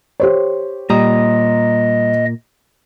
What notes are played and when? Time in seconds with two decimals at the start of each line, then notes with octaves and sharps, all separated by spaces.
0.20 G4 C5 C#5
0.90 A#2 G3 D#5 A#5 D#6